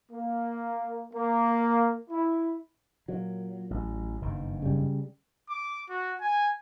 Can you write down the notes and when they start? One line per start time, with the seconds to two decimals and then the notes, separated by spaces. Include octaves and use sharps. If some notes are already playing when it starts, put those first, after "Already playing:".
0.12 A#3
1.13 A#3
2.10 E4
3.08 A#2 F#3
3.71 A1
4.22 F#1 G2 D#3
4.62 C#3 G3
5.49 D6
5.89 F#4
6.21 G#5